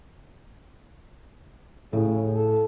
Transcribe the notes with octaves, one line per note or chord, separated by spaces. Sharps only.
A2 C#3
A4